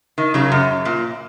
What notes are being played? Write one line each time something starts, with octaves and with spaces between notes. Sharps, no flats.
D#3
C#3 F#3
F#2
A#2